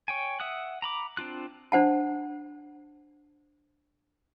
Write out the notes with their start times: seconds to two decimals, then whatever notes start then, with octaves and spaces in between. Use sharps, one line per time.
0.08 C#5 G5 G#5
0.40 E5 F#5 D#6 F#6
0.82 A#5 B5 D6
1.17 C4 D4 F4 F#6
1.72 D4 C5 F#5 A5